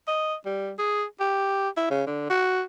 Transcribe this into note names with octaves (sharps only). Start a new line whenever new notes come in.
D#5
G3
G#4
G4
E4
C#3
D3
F#4